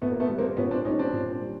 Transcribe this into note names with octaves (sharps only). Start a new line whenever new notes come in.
A#2 A3 B3
A#3
A3 B3
G3
A#3 C4
A#2 B3 C#4
C4 D4
G3 C#4 D#4
C4 D4
A#2
G3